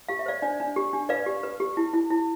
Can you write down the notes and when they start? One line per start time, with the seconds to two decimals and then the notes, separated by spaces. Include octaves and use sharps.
0.09 G4 F5
0.19 E5
0.26 C5 D5 F5
0.42 D4 D5
0.60 D4
0.76 G4
0.93 D4
1.09 B4 D5 F5
1.26 G4
1.43 B4
1.60 G4
1.77 E4
1.94 E4
2.10 E4